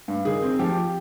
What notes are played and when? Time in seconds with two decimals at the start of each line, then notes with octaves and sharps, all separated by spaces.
0.08 G2
0.25 D#3 G#4
0.42 C4
0.59 F3 G4